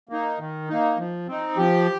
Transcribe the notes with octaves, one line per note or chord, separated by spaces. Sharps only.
A#3 D#4
D#3
A#3 D#4
F3
C4 D#4
F3 G4